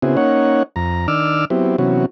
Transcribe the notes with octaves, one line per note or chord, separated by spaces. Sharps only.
C#3 B3 C4 E4 F#4 G#4
A#3 C#4 D#4 C#5 F#5
F2 A#5
D#3 D4 D6 E6 F6
F#3 B3 C4 E4 G4
C3 E3 F#3 B3 C#4 F#4